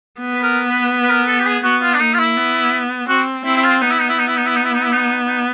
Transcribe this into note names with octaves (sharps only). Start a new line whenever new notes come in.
B3
B4
A#4
B4
B4
A#4
A4
G4
G#4
B3 F#4
F4
D4
A#3 D#4
F4
E4
B3
C4 F#4
C4 E4
E4
F4
B3 D#4
E4
D#4
E4
D#4
E4
D#4
E4
D#4
E4
D#4
E4
D#4
D#4